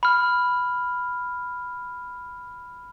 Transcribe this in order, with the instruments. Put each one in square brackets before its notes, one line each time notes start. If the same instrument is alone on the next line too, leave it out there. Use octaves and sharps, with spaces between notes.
[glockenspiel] B5 F6